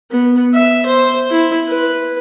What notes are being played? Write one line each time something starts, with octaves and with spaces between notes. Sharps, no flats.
B3
E5
C5
E4
B4